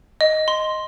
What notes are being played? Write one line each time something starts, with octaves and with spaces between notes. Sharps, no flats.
D#5
C6